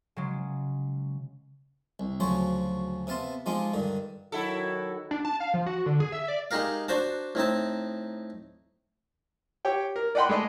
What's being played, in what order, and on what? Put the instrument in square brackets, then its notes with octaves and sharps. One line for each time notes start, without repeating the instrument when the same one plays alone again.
[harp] C#3 F#3 G#3
[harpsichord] C2
D2 C#3 F3 F#3 C5 C#5
C3 B3 F5 A5 C6
F3 G#3 D#4 F4 G4
G2 D3 D#3
[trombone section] D#3 F#3 F#4 [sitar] E4 A4
[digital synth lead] D4
A5
F5
F3
F#4
D3
G#4
E5
D5
[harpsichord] G#3 D#4 G4 A#4 F5
D4 F#4 C5 F#5 A5
A2 C4 D#4 A5
[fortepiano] G4 C#5 G5
A#4
D5 D#5 F#5 G5 B5 C6
G#3 A3 D5 D#5